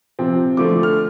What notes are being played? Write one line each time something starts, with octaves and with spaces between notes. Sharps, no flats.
C3 F3 C4
D3 F3 A3 D6
F6